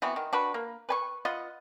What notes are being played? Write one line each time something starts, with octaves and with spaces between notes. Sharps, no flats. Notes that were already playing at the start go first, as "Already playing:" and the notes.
E3 B3 C4 F#4
D#3
D4 F#4 B4
A#3
B4 G#5 C#6
F4 B4 D#5 F#5